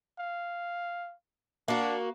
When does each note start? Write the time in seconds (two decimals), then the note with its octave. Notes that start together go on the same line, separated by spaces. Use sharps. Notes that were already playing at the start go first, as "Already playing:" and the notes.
0.19 F5
1.68 A#3 D4 F#4